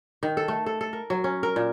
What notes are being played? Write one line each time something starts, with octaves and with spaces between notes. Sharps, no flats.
D#3
A4
A3
A4
A4
A#4
F#3
C#4
A#4
A#2